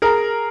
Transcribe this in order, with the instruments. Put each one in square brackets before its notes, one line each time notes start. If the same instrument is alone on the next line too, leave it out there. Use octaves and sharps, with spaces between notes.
[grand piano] G#4 A#4